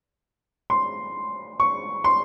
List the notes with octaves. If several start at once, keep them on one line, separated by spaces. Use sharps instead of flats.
C6
C#6
C6